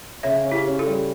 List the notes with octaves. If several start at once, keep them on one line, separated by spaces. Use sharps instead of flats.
C#3 C#5 E5
C#4
E4 G4
C#4
F4 A4
G3